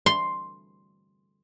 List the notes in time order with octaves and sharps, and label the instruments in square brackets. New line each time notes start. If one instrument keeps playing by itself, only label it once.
[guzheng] C6